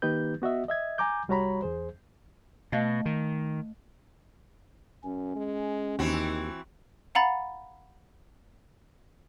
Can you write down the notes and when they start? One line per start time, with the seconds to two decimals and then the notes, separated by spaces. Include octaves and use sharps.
0.02 D#3 A#3 D#4 G4 B4 G6
0.42 B3 F#4 D#5 E5
0.68 D#5 E5 G#6
0.98 G#5 A#5 D6 G6
1.28 C2 G3 F#4 C#5 A#5 B5
1.62 E2 G#4 C5
2.72 B2 A3 D#5 F5
3.06 D#3
5.04 F#2 C#4
5.36 G#3
5.99 D#2 D#3 E3 C4 F#4
7.15 F5 F#5 A#5 B5 A6